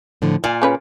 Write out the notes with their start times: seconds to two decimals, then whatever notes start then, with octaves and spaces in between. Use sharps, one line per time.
0.22 A2 D3 F3
0.44 A#2 D5 G#5
0.62 C#3 C#4 B4